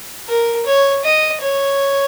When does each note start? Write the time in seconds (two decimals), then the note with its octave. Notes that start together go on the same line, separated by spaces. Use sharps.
0.28 A#4
0.65 C#5
1.04 D#5
1.41 C#5